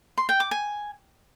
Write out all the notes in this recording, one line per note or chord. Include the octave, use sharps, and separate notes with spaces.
C6
G5
D6
G#5